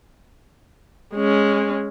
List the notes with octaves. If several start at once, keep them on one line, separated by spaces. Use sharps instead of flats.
G#3 C#4